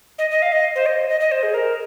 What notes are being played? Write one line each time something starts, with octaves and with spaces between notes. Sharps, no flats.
D#5
D#5
F5
D#5
C5
D#5
D#5
D#5
C5
G#4
A#4